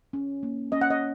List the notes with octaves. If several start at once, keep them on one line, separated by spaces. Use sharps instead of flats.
C#4
A#3
C#4 D#5
F#5
D#5